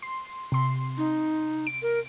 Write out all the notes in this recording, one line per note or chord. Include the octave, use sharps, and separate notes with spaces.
C6
C3 C6
D#4
D7
A#4